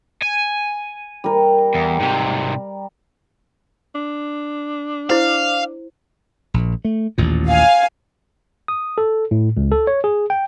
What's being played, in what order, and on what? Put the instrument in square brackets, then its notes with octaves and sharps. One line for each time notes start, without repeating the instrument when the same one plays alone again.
[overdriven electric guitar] G#5
[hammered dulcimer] G3 A#4
[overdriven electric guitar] E2
G#2 C3
[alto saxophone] D4
[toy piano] E4 C5 [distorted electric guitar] F5
[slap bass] A#1
A3
A1 D#2 A#2
[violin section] F5 G#5
[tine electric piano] D#6
A4
A2
C#2
A4
C#5
G#4
G5